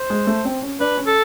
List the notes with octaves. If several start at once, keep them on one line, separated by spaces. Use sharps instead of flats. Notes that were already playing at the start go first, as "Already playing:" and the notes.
Already playing: C5
G#3
A3
C4
C#4
D4 B4
C#4
A4